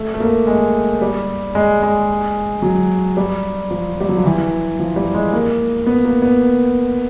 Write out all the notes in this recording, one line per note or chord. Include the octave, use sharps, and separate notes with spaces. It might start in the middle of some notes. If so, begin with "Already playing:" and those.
Already playing: A3
A3
A#3
G#3
G3
G#3
G#3
F#3
G3
F3
G3
F#3
F3
E3
F3
G3
G#3
A#3
B3
A#3
B3